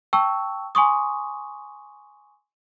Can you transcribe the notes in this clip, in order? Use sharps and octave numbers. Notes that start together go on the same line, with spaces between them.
G5 A5 C#6 E6
G#5 C6 C#6 D#6